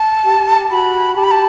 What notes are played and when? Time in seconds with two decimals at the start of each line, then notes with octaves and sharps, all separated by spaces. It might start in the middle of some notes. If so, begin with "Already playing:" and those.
Already playing: A5
0.25 G4
0.71 F#4 B5
1.16 G4 A5
1.24 B5
1.31 A5